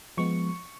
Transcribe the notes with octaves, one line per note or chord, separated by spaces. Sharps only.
F3 G#3 B3 C#6